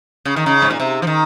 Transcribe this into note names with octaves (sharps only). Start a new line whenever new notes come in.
C#3
D#3
C#3
G#2
A#2
C3
F3
D#3